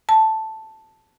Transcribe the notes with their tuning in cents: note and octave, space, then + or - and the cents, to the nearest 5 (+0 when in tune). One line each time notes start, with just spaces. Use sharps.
A5 +0